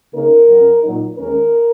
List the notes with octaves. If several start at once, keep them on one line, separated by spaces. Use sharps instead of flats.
C#3 A#3 D#4 A#4
F#2 F#3 C#4
A#2 F#3 D#4
D#2 D#3 G#3 C#4 A#4